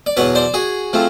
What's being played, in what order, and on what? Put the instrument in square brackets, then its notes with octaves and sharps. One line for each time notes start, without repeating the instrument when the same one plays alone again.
[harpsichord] D5
E2 B2 F#3 B4 C#5
C5 D5
F#4 G#4
F3 A3 C4